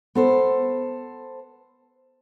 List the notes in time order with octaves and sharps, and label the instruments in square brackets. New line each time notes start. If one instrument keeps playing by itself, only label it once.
[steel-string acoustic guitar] B3 A4 C5